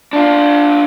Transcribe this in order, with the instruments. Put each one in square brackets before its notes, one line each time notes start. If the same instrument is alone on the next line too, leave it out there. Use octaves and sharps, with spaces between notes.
[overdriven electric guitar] D4 F4